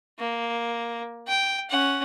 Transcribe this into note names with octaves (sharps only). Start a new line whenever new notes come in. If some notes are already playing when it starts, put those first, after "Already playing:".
A#3
G5
C#4 F#5